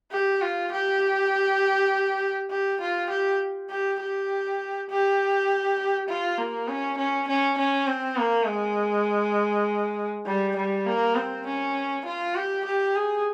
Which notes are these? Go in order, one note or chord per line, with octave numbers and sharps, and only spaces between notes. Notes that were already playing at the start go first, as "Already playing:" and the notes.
G4
F4
G4
G4
F4
G4
G4
G4
G4
F4
A#3
C#4
C#4
C#4
C#4
C4
A#3
G#3
G3
G3
A#3
C4
C#4
F4
G4
G4
G#4